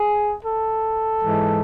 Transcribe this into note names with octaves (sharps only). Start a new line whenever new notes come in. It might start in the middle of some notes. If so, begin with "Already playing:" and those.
Already playing: G#4
A4
G#2 E3 G#3